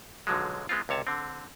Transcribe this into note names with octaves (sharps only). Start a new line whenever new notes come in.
B1 D3 F3 F#3 G#3
G#3 B3 C4 F4
C#2 C3 C#5 A5
D3 C4